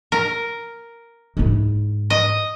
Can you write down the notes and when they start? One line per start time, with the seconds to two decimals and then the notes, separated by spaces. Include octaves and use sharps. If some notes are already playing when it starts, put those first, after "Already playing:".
0.12 A#4
1.37 G#2 E4
2.10 D#5